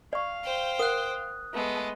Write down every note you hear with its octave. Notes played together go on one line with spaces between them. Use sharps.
D5 F5 C#6
C5 G5
A#4 F#5 D#6 F#6
G#3 A3 B3